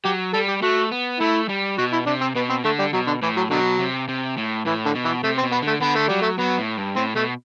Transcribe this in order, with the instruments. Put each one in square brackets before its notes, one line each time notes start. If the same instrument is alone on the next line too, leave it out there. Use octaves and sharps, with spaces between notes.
[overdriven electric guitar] F#3 [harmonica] G4
[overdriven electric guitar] G3 [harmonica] A4
[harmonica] G4
[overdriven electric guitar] A3 [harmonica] F#4
[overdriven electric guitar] B3
[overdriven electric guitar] A3 [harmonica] E4
[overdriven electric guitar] G3
[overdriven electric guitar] B2 [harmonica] F#4
[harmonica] E4
[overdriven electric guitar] C3 [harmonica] D4
[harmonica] C4
[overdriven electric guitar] B2 [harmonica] B3
[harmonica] C4
[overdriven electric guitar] D3 [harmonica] A3
[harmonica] G3
[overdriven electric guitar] B2 [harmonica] F#3
[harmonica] D3
[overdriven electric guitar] A2 [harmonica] E3
[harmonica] F#3
[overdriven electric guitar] B2 [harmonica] D3 F#3
[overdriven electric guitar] C3
C3
A2
[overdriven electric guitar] A2 [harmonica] E3
[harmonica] D3
[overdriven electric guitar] B2
[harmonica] E3
[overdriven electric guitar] C3 [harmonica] A3
[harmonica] C4
[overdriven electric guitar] B2
[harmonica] B3
[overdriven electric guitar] D3 [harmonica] A3
[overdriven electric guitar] D3 [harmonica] B3
[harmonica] A3
[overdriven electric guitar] F#3 [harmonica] G3
[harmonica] A3
[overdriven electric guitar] F#3 [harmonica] B3
[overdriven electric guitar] A2
G2
[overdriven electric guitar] A2 [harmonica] C4
[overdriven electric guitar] B2 [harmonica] A3